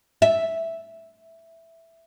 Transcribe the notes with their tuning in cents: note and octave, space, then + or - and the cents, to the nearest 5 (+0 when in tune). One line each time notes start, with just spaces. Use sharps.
E5 -5